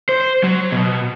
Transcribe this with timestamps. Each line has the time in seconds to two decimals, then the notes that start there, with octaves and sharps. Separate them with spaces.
0.09 C5
0.44 F#3
0.72 B2